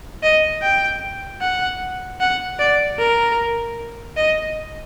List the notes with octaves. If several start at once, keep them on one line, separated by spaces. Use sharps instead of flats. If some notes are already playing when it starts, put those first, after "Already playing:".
D#5
G5
F#5
F#5
D5
A#4
D#5